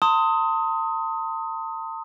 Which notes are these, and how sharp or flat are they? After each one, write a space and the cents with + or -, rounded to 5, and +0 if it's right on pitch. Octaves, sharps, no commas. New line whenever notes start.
A5 +40 C6 +0 D#6 +20